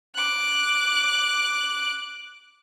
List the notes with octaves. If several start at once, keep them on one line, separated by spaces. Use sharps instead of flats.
D6 F#6